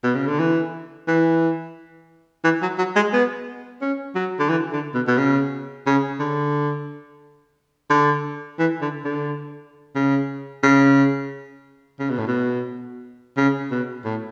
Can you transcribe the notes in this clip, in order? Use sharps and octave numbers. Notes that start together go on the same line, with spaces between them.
B2
C#3
D3
E3
E3
E3
F#3
F#3
G#3
B3
C#4
F#3
D3
E3
D3
B2
B2
C#3
C#3
D3
D3
E3
D3
D3
C#3
C#3
C#3
B2
A2
B2
C#3
B2
A2